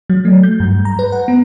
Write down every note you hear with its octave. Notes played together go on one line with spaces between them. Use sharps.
F#3
A3
G6
G2
A#5
B4
F#5
B3